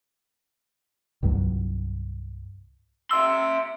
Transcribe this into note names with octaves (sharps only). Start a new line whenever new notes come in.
C2 G2 F#3
E5 C6 E6